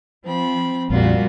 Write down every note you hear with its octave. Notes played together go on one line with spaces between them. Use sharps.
F3 C4 B5
A#1 F2 A#2 G3 F4 F#4